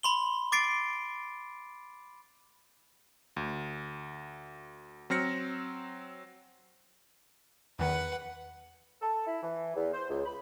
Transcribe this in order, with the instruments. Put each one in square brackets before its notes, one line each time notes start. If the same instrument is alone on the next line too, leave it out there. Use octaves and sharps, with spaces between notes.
[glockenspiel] B5 C6 G7
D6 A6 C7 D7
[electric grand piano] D2
F#3 C4 F6 A#6 C#7
[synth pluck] E2 D#3 [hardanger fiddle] B4 F#5
[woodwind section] A4
E4
E3
E2
C5
C#2
B5